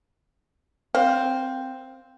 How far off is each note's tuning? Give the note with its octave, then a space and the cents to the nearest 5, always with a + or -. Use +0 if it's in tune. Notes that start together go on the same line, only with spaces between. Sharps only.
C4 +0 F5 +10